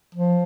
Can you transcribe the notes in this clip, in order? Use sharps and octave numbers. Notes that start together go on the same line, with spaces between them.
F3